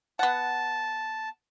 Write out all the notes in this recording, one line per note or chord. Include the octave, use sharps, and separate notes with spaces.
B3 F#5 A5